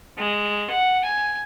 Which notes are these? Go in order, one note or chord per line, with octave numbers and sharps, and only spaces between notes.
G#3
F#5
G#5